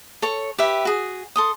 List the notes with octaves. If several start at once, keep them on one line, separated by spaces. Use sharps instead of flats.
A4 C#5 C#6
G4 B4 E5
F#4 G#4
A4 C6 D#6